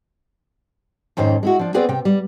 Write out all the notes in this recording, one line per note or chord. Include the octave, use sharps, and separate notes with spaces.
F2 G#2 D#3 C#4 C5
G#3 E4 F#4
F3 D4
B3 C4 G#4 B4 C5 D5
C3 G5
G3